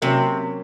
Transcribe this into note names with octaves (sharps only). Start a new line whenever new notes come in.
C3 F#3 A#3 C#4